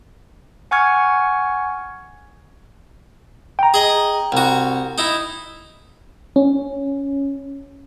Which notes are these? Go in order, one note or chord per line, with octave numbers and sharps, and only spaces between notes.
F#5 G#5 C#6 F6 G#6
G5 A#5
G#4 D#5
C2 F#4
D#4 E4
C#4